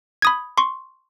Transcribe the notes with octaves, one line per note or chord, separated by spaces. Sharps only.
B5 D#6 G#6
C6 C#6